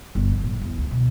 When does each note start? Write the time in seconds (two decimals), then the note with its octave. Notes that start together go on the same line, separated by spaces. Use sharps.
0.15 G1
0.31 F3
0.44 A2
0.61 E2
0.78 D2
0.91 B2